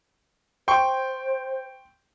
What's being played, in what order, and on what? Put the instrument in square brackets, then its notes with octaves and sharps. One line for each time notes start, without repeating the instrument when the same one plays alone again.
[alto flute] C5 [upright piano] G5 C6 C#6